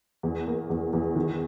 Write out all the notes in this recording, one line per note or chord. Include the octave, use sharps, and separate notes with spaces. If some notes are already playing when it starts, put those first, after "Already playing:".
E2
A#3
E2
E2
D#3